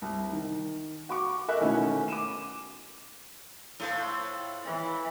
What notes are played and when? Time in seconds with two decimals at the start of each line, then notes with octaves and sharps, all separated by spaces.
0.02 C2
0.32 D#3
1.09 F#4 C#6 D6
1.48 A4 A#4 D#5 E5 F#6
1.60 B2 D#3 A3 C#4 E4 F#4
2.08 D6 D#7 E7
3.80 A2 F4 A4 C5
4.65 E3